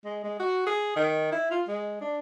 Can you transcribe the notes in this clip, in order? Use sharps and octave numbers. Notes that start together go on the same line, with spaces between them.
G#3
G#3
F#4
G#4
D#3
E4
F4
G#3
D4